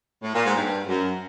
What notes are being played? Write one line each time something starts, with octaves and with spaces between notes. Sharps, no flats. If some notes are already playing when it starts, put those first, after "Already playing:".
A2
A#2
G#2
G2
F#2